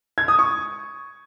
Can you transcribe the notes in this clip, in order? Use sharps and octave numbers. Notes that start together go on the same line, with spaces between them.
G#6
D#6
C#6